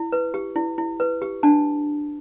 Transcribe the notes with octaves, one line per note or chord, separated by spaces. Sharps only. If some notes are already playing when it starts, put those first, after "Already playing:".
Already playing: E4
B4
G4
E4
E4
B4
G4
D4 A5